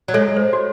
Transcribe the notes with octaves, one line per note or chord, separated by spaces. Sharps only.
F#3
G#3 A4 C#5
C5
F#4